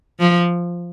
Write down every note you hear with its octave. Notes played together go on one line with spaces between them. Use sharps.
F3